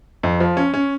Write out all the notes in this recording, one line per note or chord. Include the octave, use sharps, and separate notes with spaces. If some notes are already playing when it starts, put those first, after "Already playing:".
F2
F3
C#4
C#4